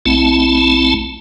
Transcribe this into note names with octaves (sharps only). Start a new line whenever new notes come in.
B1 A3 C4 E4 A5